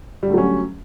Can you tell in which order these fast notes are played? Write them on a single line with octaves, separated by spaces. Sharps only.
G3 D3 A3 F#3 C#4